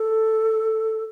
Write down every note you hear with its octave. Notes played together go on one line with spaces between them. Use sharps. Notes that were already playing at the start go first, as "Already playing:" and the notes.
Already playing: A4